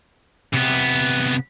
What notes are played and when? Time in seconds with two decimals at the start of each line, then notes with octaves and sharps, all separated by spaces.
0.53 C3 B3